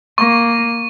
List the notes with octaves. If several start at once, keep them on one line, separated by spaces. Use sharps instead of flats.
A#3 C#6